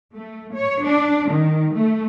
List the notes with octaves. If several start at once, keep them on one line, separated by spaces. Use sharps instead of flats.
A3
C#5
D4
D#3
A3